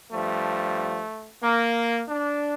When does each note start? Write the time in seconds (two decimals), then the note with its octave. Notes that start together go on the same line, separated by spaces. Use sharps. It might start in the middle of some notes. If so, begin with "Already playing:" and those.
0.12 G2 F3 A3
1.42 A#3
2.08 D4